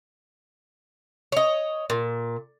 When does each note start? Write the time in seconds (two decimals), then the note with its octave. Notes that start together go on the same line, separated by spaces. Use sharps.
1.32 C#5 D#5
1.90 A#2